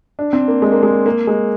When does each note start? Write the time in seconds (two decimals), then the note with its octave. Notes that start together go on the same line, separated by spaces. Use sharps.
0.19 D4
0.33 C4
0.48 A#3
0.62 G#3
0.72 A#3
0.83 G#3
1.06 A#3
1.27 G#3